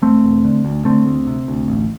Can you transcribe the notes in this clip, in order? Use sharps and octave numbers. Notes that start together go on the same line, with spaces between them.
E1 A3 C4
E1
D3
D2
D3 A3 C4
D2
C3
D2
A1